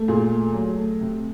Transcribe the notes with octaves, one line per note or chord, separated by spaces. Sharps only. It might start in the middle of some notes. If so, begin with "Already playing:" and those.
Already playing: A3
A#2 G#4
A3
F#3
A3
C3